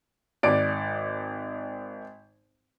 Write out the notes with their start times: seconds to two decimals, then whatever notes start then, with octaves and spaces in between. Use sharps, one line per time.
0.43 G#1 D5 D7